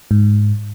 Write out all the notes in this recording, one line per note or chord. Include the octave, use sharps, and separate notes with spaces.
G#2